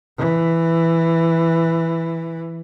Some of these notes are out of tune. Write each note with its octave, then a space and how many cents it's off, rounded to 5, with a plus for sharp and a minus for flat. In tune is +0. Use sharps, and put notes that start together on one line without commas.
E3 +5